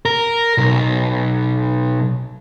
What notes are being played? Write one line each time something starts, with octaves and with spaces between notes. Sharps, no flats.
A#4
B1